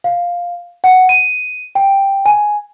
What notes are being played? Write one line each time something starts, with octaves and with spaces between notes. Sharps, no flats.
F5
F#5
D#7
G5
G#5